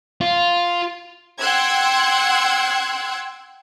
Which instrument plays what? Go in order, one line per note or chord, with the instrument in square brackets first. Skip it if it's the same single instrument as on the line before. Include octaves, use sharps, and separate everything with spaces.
[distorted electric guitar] F4
[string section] F#5 G5 C6 E6 F#6 G#6